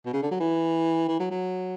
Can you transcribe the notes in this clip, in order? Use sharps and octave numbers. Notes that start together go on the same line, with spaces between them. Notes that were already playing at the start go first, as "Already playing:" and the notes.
B2
C#3
D3
F#3
E3
E3
F#3
F#3